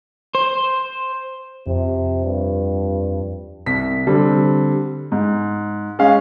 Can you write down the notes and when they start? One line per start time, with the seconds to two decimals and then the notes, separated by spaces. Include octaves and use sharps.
0.35 C5
1.67 F2 C3
2.25 G2
3.66 C2 B6
4.07 D3 G3 C4
5.12 G#2
5.99 G#3 C#4 G#4 F5